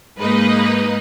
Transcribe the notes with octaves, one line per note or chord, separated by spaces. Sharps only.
G#2 G#3 A#3 D#4 B4 D#5